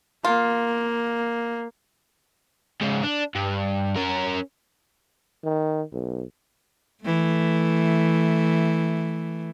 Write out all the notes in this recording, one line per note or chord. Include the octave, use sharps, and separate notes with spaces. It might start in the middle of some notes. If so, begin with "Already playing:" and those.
A#3 F4
G#2 C#3
D4
G2
C#4 A#4
D#3
B1
E3 A3